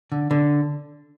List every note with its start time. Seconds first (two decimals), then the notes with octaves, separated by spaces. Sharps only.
0.12 D3
0.31 D3